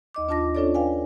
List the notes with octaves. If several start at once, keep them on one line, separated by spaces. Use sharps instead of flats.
D#2 D#5 D6
D#2 D4 F4 A5 D6 A#6
C#4 D4 F4 A4 C#5 D5
B4 F5 G5 G#5